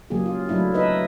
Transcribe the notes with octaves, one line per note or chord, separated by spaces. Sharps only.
C#3 F#3 A#3 G4 G#4
F4
F#3 A3 D4 E4
D#4 B4 D#5 E5